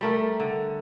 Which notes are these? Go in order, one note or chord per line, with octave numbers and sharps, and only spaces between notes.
G3 A3 A#4
D3